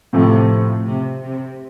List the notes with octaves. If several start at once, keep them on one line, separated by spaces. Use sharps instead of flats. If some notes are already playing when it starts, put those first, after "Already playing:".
A2 C3 F3 A3
C3
C3